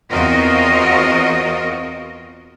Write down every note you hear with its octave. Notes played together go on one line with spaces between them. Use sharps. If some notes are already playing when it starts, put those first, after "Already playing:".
E2 C4 F4 F#4 A#4 D#5